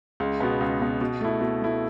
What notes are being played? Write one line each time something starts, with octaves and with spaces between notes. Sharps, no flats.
C#2
B2 B3
C#2
B2 B3
B2
A3 E4
B2
A3 E4